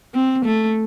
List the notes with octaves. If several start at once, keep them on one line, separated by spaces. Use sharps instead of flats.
C4
A3